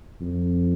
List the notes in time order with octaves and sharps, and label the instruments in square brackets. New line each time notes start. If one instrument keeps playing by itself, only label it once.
[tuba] F2